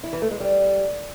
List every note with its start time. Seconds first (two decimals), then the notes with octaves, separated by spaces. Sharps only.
0.04 E4
0.13 E3
0.22 A3
0.31 G#3
0.40 G3